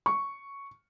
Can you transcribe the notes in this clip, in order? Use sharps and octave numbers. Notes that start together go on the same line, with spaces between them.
C#6